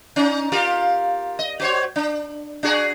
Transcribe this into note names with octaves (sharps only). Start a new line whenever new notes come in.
C#4 D#4
F4 G4 A#4
D#5
F#4 C5 C#5
D4
D4 F#4 G#4